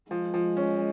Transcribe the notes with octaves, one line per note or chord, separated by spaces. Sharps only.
F3 G#3
F3
C#4